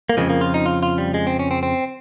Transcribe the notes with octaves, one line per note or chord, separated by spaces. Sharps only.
A#3
F2 C#3 F3 G#3
A#3
F4
D#4
F4
F4
G3
G#3
C4
C#4
C4
C4